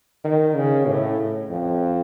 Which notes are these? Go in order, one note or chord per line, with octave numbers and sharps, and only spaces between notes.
D#3
C#3
A2
F2